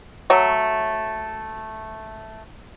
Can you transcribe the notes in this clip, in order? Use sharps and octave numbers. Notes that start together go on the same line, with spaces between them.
F#3 A3 F#4 C#5